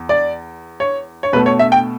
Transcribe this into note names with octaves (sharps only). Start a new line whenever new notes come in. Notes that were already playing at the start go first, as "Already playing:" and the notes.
Already playing: E2
D5
C#5
C#5
B2 A3 B4
C#5
E5
G5